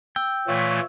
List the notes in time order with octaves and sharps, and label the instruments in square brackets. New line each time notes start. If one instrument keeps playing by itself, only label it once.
[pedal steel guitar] G5 [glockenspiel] E6
[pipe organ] A#2 E3 A3 [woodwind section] F4 C#5